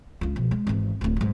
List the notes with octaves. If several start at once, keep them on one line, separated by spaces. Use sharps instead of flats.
C#2 F4
B2 F3
G#3
G#1 E2
D1 D2
G#2 F#3